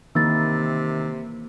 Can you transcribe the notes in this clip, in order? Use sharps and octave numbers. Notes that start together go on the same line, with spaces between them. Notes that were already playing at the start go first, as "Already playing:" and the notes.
C3 D#3 E3 A#3 E6 A6